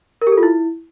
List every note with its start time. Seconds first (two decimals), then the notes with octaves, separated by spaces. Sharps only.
0.22 A#4
0.27 G4
0.32 A4
0.37 F4
0.43 E4